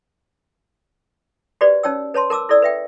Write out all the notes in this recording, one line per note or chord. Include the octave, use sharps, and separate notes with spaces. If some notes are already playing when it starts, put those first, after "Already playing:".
F#4 G4 B4 C5 D5
C#4 D#4 C#5 G5 E6
B4 C#5 A5 C6
A#4 A5 D6 E6
E4 A4 D5 E6
B4 E5 G5